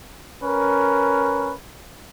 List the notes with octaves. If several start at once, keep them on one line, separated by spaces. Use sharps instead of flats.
C#4 A#4 B4